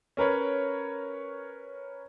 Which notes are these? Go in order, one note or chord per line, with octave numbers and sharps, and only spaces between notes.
C#4 A#4 B4 C#5